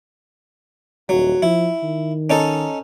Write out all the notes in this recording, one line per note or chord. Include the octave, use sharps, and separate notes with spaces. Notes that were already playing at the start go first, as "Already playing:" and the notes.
D#1 F#3
F3 E4
D#3
C#4 D#4 A4